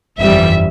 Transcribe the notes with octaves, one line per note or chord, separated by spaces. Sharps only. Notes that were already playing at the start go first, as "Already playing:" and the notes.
G1 F2 E3 G3 E5